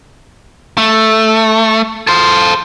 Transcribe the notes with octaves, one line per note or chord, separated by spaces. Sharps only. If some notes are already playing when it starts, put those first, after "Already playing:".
A3
A4 C5